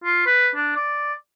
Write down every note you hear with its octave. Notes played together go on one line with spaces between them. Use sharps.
F4
B4
D4
D5